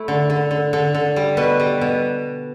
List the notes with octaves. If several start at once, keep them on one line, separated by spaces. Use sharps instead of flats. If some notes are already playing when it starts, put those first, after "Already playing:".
Already playing: A3 E4
D3
D3
D3
D3
D3
G3
B2 B4
G3
B2